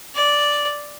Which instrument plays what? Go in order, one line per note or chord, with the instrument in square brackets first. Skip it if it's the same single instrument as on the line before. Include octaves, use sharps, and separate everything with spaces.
[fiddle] D5